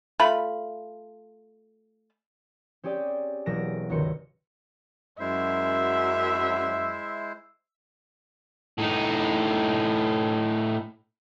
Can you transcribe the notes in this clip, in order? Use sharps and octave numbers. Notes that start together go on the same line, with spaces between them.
A3 F4 B5
C4 C#4 G4 G#4 D5
E1 F#3 A#6 D7 E7
G1 C#2 D#3 F#4 C6 C#7
F#2 G#3 E4 C5 E5
A2 D#4